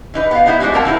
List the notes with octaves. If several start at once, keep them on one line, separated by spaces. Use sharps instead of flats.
E3 D#4 B4
B3 F5
B3 D#4 E4 C5 E5
G3 G#3 B3 F#4 C5
A#3 C4 A#4 F#5 A5
E3 D#4 E4 B4